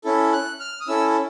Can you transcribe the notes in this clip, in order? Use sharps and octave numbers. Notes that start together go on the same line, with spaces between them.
C#4 E4 A4
F#6
F6
D#6
C#4 E4 A4 E6